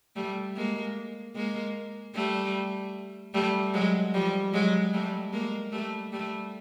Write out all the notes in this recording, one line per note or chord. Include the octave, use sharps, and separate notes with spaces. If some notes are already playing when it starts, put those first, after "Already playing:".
G3 A3
G#3 A#3
G#3 A#3
G3 A3
G3 A3
F#3 G#3
F3 G3
F#3 G#3
G3 A3
G#3 A#3
G3 A3
G3 A3